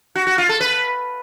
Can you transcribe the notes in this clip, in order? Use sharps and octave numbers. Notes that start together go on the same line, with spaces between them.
F#4
F#4
F4
A4
B4